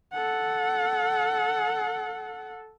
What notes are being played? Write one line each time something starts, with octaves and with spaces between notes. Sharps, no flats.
A4 F#5